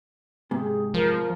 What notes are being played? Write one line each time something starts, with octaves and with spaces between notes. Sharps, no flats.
G#2 C3 G#4
F3 A#4